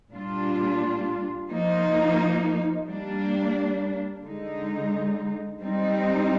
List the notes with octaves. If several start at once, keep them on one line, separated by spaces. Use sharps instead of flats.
A#2 G3 D4 F4
F3 A#3 D#4
G3 A#3 D4
D3 G#3 D#4
G3 C4 D#4